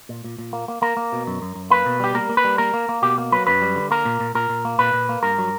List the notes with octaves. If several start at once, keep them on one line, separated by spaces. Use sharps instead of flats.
A#2
A#2
A#2
A#3
A#3
A#3 A#4
A#3
B2
F#2
F#2
F#2
A#3 B4
B2
G3 G4
A#3 A#4
A#3
B4
G3
A#3 A#4
A#3
A#3
B2 G4
A#3
F#3 B4
F#2 B4
G3
D3
A#3 A#4
A#2
A#2
A#2 A#4
A#2
A#3
A#2 B4
A#2
A#3
G2 A#4
F#3